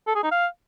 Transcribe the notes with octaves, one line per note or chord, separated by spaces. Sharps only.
A4
G#4
D#4
F5